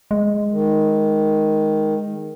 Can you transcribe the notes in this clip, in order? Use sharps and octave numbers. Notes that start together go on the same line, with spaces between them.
G#3
D#3